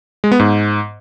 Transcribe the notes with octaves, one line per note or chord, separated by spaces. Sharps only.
G#3
B3
G#2